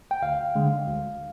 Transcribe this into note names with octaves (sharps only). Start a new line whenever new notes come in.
G5
D2 F5
D3 G#3
D2